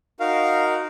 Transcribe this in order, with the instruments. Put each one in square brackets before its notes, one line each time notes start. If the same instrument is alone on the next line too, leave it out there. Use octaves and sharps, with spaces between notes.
[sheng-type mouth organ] D#4 F#4 A#4 [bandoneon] F5